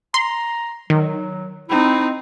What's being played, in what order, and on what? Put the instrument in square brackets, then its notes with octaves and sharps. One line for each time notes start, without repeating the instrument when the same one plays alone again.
[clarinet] A#5 [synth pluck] C6
[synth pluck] D#3 [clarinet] F#3
[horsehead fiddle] C4 D#4 [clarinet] E4